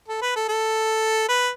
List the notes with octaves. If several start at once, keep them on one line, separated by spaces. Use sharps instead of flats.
A4
B4
A4
A4
B4